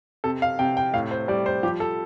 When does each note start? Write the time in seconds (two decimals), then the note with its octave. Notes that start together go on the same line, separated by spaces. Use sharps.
0.24 C3 A4
0.42 F5
0.59 C3 G5
0.77 G5
0.93 A2 F5
1.11 C5
1.28 G3 D5
1.46 C5
1.63 F3 G4
1.80 A4